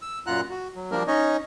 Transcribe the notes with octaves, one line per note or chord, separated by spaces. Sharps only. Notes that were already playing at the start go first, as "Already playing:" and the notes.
E6
F#2 A#2 F4 F#5 A#5 F#6
F#4
F#3
F3 G3 A#3 D4 A#4
C#4 D#4 C#5 D#5